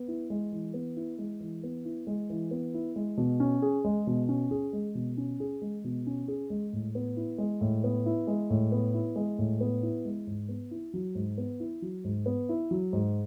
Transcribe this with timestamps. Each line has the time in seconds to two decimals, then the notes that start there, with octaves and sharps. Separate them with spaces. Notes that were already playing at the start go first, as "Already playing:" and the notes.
Already playing: B3
0.08 E4
0.30 G#3
0.52 E3
0.74 B3
0.97 E4
1.18 G#3
1.40 E3
1.63 B3
1.85 E4
2.07 G#3
2.30 E3
2.51 B3
2.74 E4
2.96 G#3
3.17 B2
3.40 C#4
3.62 G#4
3.85 G#3
4.07 B2
4.29 C#4
4.51 G#4
4.73 G#3
4.95 B2
5.17 C#4
5.40 G#4
5.62 G#3
5.84 B2
6.07 C#4
6.28 G#4
6.50 G#3
6.73 A2
6.95 B3
7.17 E4
7.38 G#3
7.61 A2
7.84 B3
8.06 E4
8.27 G#3
8.50 A2
8.72 B3
8.94 E4
9.16 G#3
9.38 A2
9.61 B3
9.83 E4
10.05 G#3
10.27 G#2
10.49 B3
10.71 E4
10.94 F#3
11.15 G#2
11.38 B3
11.60 E4
11.82 F#3
12.04 G#2
12.26 B3
12.49 E4
12.71 F#3
12.93 G#2